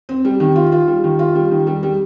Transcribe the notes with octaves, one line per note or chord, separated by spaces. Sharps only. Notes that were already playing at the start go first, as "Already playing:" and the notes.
C4
G3
D#3
F4
F4
G3
D#3
F4
G3
D#3
G3
G3